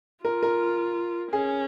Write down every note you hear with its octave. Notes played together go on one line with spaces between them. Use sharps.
F4 A#4
A#4
C#4 G#4